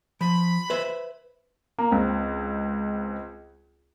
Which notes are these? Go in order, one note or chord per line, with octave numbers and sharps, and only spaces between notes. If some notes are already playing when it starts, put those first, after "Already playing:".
F3 B5
B4 C5 E5
A#3
C#2 C4